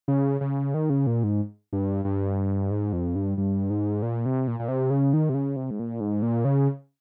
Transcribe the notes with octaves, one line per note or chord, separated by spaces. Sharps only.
C#3
C#3
D#3
C#3
A#2
G#2
G2
G2
G#2
F2
G2
G2
G#2
A#2
C3
A#2
A#2
C3
C#3
D#3
C3
C#3
C3
G#2
A#2
G#2
A#2
C#3